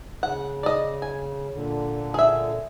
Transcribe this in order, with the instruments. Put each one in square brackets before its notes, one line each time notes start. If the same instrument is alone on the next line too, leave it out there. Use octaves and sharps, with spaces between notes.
[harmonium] C#3 [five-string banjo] F#5
[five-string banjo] D5 D#5
G#5
[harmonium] A#2 D3
[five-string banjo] G#4 E5